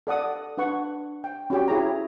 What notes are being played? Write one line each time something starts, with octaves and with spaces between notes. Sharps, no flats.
A4 D5 F#5 D#6
D4 B4 F#5 C#6
G5
C#4 F#4 G4 G5
E4 G#4 C#5 A#5